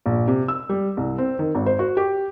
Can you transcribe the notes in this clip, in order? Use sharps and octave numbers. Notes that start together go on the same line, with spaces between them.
A#1
C3
E6
G3
C2
C4
D#3
G#1
C5
F#4
G4